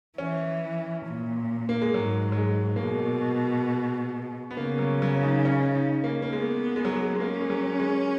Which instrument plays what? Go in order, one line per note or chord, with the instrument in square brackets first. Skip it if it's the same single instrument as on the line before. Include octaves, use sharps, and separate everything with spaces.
[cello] E3 [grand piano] C#4
[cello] A#2
[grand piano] A#3
G#3
[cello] G#2 [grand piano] F#3
[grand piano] F#3
G#3
A#3
[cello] B2 [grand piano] G#3
[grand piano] B3
[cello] C#3 [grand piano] A#3
[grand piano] F#3
F#3
D#4
C#4
D#4
A#3
A#3
[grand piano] G#3 [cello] B3
[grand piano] G#3
F#3
G#3
G#3
[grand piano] A#3 [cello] C#4
[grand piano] G#3
F#3
G#3